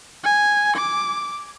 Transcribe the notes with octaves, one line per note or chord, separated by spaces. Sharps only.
G#5
D6